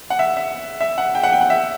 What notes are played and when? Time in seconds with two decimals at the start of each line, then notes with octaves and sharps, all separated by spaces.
0.10 F#5
0.19 E5
0.37 E5
0.81 E5
0.98 F#5
1.15 G5
1.23 F#5
1.33 G5
1.41 F#5
1.50 E5